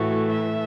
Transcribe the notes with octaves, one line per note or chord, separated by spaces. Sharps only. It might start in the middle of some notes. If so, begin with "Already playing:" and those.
Already playing: A2 E3 A3 F#4
E5